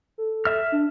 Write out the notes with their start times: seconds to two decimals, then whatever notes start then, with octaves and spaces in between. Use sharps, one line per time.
0.18 A4
0.45 E5 F6
0.72 D4